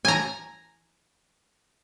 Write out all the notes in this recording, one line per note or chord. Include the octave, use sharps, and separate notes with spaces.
G#5 A#5